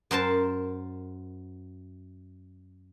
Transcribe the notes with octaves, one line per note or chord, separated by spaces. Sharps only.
F#2 A#4 C5 A5